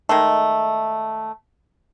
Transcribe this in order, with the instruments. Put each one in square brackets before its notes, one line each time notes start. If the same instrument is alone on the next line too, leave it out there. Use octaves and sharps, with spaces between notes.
[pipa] D#3 G#3 A3